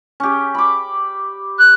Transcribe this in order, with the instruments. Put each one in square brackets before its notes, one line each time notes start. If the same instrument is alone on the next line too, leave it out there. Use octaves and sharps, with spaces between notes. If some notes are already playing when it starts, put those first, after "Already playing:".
[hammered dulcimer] C#4 G4
B5 D6
[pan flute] F#6